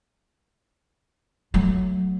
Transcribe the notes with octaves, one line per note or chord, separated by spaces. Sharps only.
F#3 A3